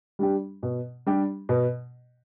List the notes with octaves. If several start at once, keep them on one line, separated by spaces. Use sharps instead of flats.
G3 D4 G4
B2
G3 D4 G4
B2